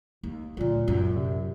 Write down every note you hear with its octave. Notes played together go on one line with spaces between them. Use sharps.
D#2
D2 A#2 F#3
F#2
C3